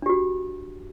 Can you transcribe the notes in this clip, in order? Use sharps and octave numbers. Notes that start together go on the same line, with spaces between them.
D4 F#4 G4